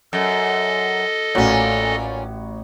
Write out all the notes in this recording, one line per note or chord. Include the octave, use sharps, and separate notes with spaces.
F#2 A4 D#5
A1 A#2 C#4 F#4 C#5